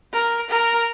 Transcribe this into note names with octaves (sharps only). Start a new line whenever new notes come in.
A#4
A#4